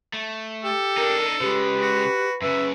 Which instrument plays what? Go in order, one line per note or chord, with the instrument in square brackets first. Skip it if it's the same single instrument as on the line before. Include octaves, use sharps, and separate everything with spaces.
[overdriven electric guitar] A3
[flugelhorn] G4 [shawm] A4
[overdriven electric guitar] D4 D#4 [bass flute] A#4
[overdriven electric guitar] C#3 G#3 [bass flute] G4 [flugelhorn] B4
[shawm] F#4
[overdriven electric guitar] F#2 C#3 [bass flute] B4 [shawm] E5